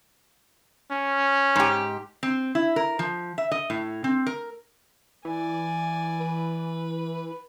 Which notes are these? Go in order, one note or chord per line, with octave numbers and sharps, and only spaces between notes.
C#4
G#2 G4
C4
E4
A#4
F3
E5
D#5
A2
C4
A#4
E3 D5 G#5
B4